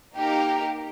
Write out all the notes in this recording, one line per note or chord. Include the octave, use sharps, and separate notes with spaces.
A#3 D#4 G4 A#4